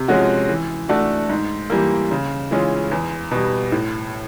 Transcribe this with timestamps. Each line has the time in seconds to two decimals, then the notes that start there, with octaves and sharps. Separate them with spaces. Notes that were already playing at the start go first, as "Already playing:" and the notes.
Already playing: C3
0.08 F3 G#3 C#4 F#4
0.49 E3
0.89 A3 D4 F#4
1.29 G#2
1.70 E3 G3 A#3
2.11 C#3
2.51 E3 G#3 C#4 F4
2.91 E2
3.31 B2 G3
3.72 A2